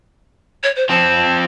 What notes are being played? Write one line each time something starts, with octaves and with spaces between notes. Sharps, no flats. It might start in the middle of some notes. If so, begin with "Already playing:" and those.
C#5
C5
F3 C4 A5